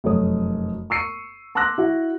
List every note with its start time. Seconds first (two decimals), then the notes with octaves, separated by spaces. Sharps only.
0.04 F1 F#2 A4 C#5 D#6
0.90 C#6 E6 C7 C#7 D#7
1.55 A5 C6 D6 E6 F#6 A#6
1.78 E4 F#4